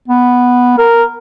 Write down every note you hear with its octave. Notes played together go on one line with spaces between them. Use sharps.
B3
A#4